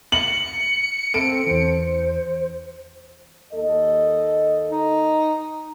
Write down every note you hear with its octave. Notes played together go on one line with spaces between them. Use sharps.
C#7 F#7
C4 A4 D7
E2 E3 C5
D#2 A4 D#5
D#4